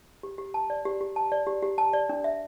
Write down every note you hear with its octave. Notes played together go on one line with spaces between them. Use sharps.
G4
G4
A5
D5
G4
G4
A5
D5
G4
G4
A5
D5
D4
E5